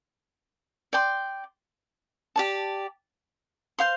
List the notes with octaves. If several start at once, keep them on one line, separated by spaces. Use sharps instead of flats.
D5 G5 C6
G4 D5 A5
C5 F5 C6